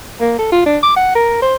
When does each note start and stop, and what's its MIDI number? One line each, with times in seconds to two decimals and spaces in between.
0.20 0.34 58
0.39 0.50 69
0.52 0.64 65
0.66 0.78 62
0.83 0.95 86
0.96 1.15 78
1.15 1.40 70
1.42 1.55 72